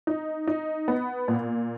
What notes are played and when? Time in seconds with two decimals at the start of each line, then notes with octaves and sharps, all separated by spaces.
0.07 D#4
0.47 D#4
0.88 B3
1.28 A#2